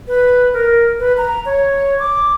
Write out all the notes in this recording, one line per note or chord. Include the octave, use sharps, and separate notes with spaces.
B4
A#4
B4
A#5
C#5
D6